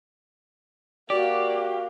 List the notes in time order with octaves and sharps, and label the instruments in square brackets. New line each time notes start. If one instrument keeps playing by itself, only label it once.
[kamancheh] A#3 F5 [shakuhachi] F#4 [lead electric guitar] G4 [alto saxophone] D5